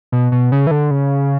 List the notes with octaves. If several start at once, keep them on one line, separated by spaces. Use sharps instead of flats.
B2
B2
C#3
E3
D3
C#3